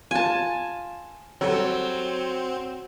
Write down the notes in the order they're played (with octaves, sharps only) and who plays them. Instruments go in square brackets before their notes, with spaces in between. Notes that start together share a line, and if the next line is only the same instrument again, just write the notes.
[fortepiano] F4 [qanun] G#5 A5
[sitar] F#3 [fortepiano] G3 A4 C#5 [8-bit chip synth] C4